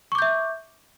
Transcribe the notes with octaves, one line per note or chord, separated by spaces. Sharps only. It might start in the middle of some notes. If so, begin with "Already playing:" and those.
E5 C#6 D6 G6